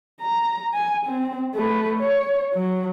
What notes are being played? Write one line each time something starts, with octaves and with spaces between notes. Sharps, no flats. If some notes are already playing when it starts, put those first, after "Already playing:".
A#5
G#5
C4
A3 B4
C#5
F#3